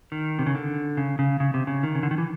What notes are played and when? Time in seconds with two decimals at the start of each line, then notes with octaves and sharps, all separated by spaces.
0.12 D#3
0.39 C3
0.46 C#3
0.55 D3
0.97 C#3
1.19 C#3
1.40 C#3
1.54 C3
1.67 C#3
1.83 D#3
1.95 C#3
2.03 D3
2.11 D#3
2.18 E3